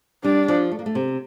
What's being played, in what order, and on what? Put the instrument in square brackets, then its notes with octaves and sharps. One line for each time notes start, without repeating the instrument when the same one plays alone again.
[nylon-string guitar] G3 [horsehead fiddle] D4
[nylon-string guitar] F3
A3
A#3
A3
C3